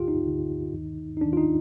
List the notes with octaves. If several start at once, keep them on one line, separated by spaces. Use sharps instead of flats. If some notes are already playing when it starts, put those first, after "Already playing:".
Already playing: D2 D3 F4 G4
D#4
D2 D3
D#2 D#3
D#4
D#2 D#3 D4
F4
D#4